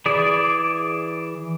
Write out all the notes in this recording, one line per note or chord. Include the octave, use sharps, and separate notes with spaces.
E3 G#4 D5